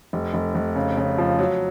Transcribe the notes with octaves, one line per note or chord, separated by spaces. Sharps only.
F1
F1
F1
C#3
C#3
F3
F#3